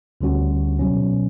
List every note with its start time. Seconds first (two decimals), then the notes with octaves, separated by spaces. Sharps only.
0.21 D2 D3 G3 C#4 F#4
0.79 B1 B2 F#3 C#4